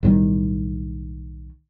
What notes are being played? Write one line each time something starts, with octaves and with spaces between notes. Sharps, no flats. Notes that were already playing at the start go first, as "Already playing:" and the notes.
B1 A2 D#3 G3